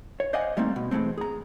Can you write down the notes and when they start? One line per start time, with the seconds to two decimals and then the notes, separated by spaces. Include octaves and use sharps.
0.20 C#5
0.33 C5 D5 D#5 F5 F#5 G#5
0.57 G3 A3 A#3 C4 D#4
0.76 B2
0.91 B2 E3 G#3 A3 C4
1.18 G#4 A#5